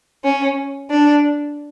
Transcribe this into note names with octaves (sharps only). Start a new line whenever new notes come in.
C#4
D4